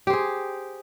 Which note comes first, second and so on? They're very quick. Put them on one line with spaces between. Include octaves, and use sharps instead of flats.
G4 C5 G#4